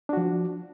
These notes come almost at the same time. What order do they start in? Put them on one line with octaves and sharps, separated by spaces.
D4 F#4 F3